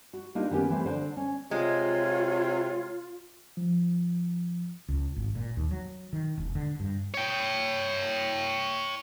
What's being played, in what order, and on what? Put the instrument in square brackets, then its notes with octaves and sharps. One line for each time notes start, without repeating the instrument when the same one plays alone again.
[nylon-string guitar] F#4
A#3 D4 D#4 F4 G4
D#3 B3 C#4 G4
E3 A3 C4
D3 C5
C#4
[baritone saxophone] C3 [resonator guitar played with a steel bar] G#3 [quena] F4 [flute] C#5
[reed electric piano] F3
[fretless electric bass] C#2
G#1
A#2
D#2
F#3
D#3
E1
D3
G2
[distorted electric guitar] C#5 G5